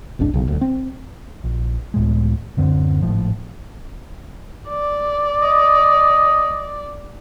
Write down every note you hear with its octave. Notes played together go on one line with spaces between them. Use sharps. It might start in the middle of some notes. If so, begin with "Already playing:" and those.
F1 C2 G#2 D4
B1 C#3
D#1 D2
C4
A#1
C#2 A2 G#3
D1 F#2 D3 C4
G#1 A2 F3
D5
D#5